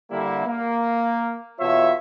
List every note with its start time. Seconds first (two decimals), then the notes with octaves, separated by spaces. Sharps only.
0.11 D3 G3 A#3 E4
0.46 A#3
1.60 E2 B2 F4 C#5 E5